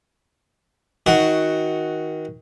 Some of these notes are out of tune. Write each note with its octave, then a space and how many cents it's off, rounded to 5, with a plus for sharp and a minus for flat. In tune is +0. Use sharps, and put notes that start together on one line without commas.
D#3 +25 F#4 +0